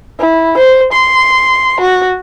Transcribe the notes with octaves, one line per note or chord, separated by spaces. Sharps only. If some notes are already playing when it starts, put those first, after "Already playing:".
E4
C5
C6
F#4